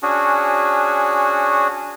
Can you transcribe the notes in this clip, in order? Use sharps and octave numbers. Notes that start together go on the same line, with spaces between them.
C#4 D4 F#4 G#4